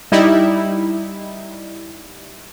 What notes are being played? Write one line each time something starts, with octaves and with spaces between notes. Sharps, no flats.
G3 D#4 E4